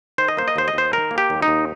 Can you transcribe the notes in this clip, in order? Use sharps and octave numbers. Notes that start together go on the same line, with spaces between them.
D#3 C5
D#5
A#3 C5
D#5
D#2 C5
D#5
D#2 C5
D#3 A#4
A#3
G4
D#2
D#4
D#2